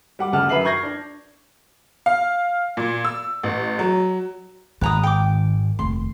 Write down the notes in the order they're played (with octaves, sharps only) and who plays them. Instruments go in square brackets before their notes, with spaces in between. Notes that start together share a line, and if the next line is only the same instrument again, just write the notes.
[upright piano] G3 F#5 D6
G1 D2 C#3 F#5 A5 F6
F#2 B4 E5 C7 F#7
C#6 G6 G#6 A#6 C7
D4
[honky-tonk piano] F5
A#2
E6
A1
F#3
[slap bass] G#1 G#2 [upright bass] D#3 [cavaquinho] B4 A#5 D#6
[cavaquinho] G5 D6
[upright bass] F1 D#2 [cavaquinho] C6